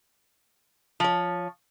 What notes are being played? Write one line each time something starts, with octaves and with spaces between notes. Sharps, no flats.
F3 C#5